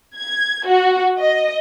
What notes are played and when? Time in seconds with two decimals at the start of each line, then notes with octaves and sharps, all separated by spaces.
0.17 G#6
0.67 F#4
1.18 D#5